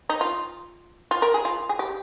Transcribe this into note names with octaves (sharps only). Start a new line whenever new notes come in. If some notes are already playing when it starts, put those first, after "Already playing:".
D#4
F4
F4
A#4
G#4
F4
G#4
G4